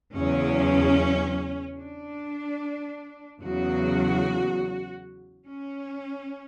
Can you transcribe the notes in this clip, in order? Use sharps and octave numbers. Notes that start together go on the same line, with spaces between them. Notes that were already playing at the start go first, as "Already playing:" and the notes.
E2 C#3 F#3 C#4
D4
E2 C#3 F#3 F#4
C#4